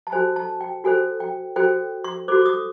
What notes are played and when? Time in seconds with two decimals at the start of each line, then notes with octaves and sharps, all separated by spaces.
0.07 A5
0.12 F#4 A4 C5 G#5
0.36 A5
0.61 G5
0.84 F#4 A4 C5 G#5
1.20 G5
1.56 F#4 A4 C5 G5
2.04 C#6
2.28 F#4 A4 C5 D6
2.41 D6
2.46 D#6